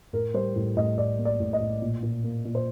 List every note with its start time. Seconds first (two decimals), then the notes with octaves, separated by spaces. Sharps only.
0.13 A2 A#4
0.34 G3 C5
0.56 A2
0.77 A2 D#5
0.97 A2 D5
1.18 A#3
1.25 D5
1.40 A2
1.53 D#5
1.60 A2
1.82 A#2
2.03 A#2
2.24 A#3
2.45 A#2
2.55 C5